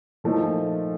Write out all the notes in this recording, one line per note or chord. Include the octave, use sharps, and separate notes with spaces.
A#2 F3 A3 D#4